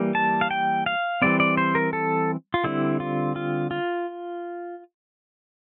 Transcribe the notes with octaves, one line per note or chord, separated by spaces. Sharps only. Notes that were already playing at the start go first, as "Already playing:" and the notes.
Already playing: E3 G3 A#3
A5
F5
G5
F5
E3 G3 C4 D5
D5
C5
A#4
A4
F4
D3 G3 C4 E4
F4
F4
F4